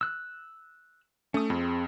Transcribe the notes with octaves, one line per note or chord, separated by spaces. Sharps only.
E6 F#6
A3 C#4 D#6
F2 C4 G#4